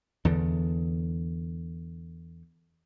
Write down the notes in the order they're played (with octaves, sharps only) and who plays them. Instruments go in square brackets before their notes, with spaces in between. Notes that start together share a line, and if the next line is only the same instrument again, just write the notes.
[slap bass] E2 D3